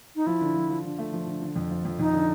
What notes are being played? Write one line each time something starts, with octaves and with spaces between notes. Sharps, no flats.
D#4
F3 E4
D3
F3
F3
D3
A3
F3
D3
D3
F2
F3
F2
F2 D#4
D3